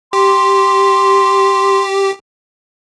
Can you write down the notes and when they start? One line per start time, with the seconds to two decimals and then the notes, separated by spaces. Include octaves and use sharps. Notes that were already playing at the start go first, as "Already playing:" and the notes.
0.13 G4 C6